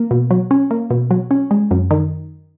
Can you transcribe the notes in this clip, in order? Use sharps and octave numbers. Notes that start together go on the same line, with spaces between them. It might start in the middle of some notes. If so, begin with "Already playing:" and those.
Already playing: A#3
B2
F#3
C#4
A#3
B2
F#3
C#4
G#3
F#2
D#3